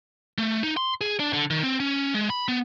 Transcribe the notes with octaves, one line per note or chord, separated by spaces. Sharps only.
A3
D#4
C6
G#4
D4
D3
D#3
C4
C#4
G#3
B5
B3